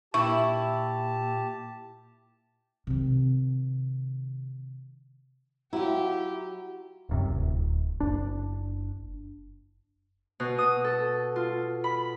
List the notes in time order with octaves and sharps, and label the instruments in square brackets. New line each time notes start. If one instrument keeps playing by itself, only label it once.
[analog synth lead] A#2 [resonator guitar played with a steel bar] E4 [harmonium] G4 A5 [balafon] C#6
[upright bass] C3 D#3
[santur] F#3 [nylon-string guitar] E4 F4 [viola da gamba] G4
[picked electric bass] D#1 F#2 C3
D1
F#1 D4
[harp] B2
D#6
A4
F4
B5